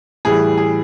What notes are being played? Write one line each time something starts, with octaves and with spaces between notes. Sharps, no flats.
A2 E3 G3 G#4
G#4